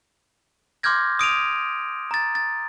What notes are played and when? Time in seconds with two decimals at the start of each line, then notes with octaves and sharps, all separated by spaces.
0.83 C6 D6 F6 G6 G#6 A#6
1.19 D#6 D7 D#7 F7
2.11 A#5 A6
2.35 A6